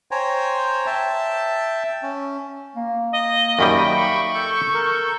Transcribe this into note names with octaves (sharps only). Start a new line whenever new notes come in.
C5 C#5 G5 G#5 A#5
E5 G5 A5
C#4
A#3
D#5
F#2 D#3 G3 E5 G5 B5
C#6
A4 G6
A#4